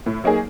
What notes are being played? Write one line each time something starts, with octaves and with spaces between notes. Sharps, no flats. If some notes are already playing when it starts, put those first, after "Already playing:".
A2
F#3 A#3 D#4 G#4